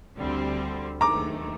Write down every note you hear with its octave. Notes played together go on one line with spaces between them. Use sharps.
D2 D3 G3 C4
D#2 D#3 A3 A#5 D6